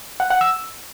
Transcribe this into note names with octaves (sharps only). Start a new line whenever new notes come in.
F#5
F#5
E6